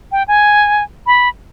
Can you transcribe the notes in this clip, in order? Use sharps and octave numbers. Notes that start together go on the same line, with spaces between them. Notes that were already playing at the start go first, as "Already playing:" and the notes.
G5
G#5
B5